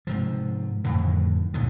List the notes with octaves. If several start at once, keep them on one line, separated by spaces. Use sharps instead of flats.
G#2 C3 F3
F2 A2 D3 D#3
C#2 A#2 D3 D#3